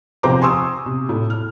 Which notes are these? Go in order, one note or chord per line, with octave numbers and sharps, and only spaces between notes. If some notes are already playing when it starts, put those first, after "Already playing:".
C3 F3 C5 G5 A#5 D6
G#5 C6 C#6 D#6 E6
C3
A2
F6